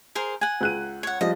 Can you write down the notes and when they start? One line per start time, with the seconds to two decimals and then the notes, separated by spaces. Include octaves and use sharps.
0.15 G#4 A#4 C5
0.41 F#5 G#5
0.61 C#2 F#6 D#7
1.03 C#5 F#5
1.21 F3 G3 D#5